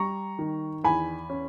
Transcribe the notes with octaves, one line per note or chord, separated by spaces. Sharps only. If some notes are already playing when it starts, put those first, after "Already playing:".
Already playing: G3 A#5 C#6
D#3
E2 G#5 B5
C#4